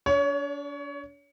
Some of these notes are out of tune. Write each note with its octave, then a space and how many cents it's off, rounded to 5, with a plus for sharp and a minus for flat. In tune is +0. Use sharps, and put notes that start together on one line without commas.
D4 -35 C#5 +25